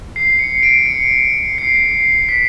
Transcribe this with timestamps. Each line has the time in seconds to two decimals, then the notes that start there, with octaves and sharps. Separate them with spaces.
0.16 C7
0.39 C#7
0.63 D7
0.86 C#7
1.58 C7
2.29 B6